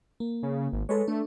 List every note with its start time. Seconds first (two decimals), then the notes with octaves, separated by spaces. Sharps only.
0.20 A#3
0.43 C#3
0.73 G#1
0.89 G#3 A4 B4 C#5
1.08 A3 D4